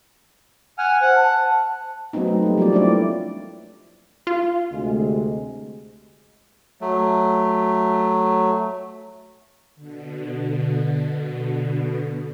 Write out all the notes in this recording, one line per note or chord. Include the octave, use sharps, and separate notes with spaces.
F#5 G#5 F6
C5 F#5
A5
F#3 A3 B3 C4 D#4
A3
G3 A#3
F3 F#3 C4 D5
A3 D4 E4 D5
F4
D2 C3 G#3
F#3 A3
B2 D3